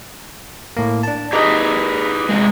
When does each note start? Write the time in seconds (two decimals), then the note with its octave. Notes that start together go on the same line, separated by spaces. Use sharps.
0.77 A2 A#3
1.03 D4 A5
1.33 D#4 G4 G#4 B4 D#5
2.29 C3 G#3